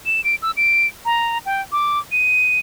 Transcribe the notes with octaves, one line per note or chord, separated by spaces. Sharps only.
E7
D7
E6
D7
A#5
G5
D6
D#7